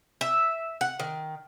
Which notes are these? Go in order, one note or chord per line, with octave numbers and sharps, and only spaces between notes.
E5
F#5
D#3